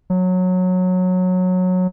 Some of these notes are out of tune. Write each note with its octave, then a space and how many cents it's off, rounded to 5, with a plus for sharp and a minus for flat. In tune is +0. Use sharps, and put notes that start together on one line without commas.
F#3 -15